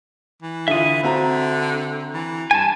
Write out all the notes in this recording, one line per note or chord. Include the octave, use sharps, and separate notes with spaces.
E3
D3 F4 E5 D#6
D3 C4 F#4 A#5
E3
G2 G#5 A5